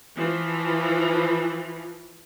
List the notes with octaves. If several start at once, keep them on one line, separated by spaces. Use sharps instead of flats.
E3 F3